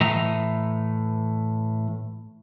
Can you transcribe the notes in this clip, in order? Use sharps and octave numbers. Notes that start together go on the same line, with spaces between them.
A2 E3 A3 D#5 A#5